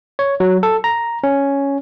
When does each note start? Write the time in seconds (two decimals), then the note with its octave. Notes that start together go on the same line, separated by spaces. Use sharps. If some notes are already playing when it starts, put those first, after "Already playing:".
0.19 C#5
0.40 F#3
0.63 A4
0.84 A#5
1.24 C#4